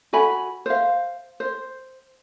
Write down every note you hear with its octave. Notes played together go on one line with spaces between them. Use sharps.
F#4 A4 G#5 B5
C5 F5
C5